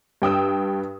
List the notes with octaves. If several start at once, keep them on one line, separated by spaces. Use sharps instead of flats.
G2 G5 D#6 E6